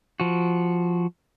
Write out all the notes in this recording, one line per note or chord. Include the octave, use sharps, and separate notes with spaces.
F3 F#4